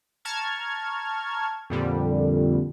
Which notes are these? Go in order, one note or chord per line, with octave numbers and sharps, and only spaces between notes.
A5 A#5 C#6 F6 G#6
F2 A#2 D3 G3